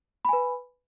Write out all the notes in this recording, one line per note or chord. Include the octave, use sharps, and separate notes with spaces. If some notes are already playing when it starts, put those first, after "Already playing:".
B4 G#5 B5